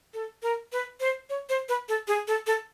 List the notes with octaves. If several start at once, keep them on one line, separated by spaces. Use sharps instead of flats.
A4
A#4
B4
C5
C#5
C5
B4
A4
G#4
A4
A4